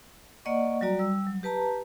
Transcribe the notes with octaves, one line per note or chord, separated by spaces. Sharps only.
A#3 D5 D#5 F#5 C#6
F#3 G3 F#4 D5 A#5
G3 E6
F#3
G4 B4 A5 A#5